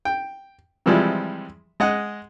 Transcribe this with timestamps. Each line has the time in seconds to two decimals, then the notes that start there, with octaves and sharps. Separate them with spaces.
0.05 G5
0.86 C3 E3 F3 G3 G#3
1.80 G#3 D#5 F#5